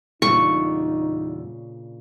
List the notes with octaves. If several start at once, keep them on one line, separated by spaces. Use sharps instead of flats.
E2 A#2 C#3 G3 D4 D#4 C#6